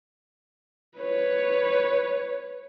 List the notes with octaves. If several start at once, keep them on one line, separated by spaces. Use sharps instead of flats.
B4 C#5